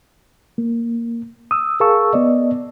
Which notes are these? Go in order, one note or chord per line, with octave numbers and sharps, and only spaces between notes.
A#3
D#6 E6
G#4 A#4 F5 A5 C#6 E6
B3 D5 D#5